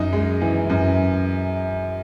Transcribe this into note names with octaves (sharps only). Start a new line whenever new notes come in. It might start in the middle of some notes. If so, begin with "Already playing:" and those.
Already playing: F#2 D#4
G#3
E3
F#2